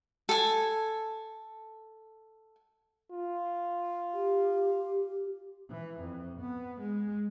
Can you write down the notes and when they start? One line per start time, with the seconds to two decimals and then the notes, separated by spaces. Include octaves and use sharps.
0.29 A4 G#5
3.11 F4
4.14 G4
5.70 E3
6.00 F2
6.40 B3
6.80 G#3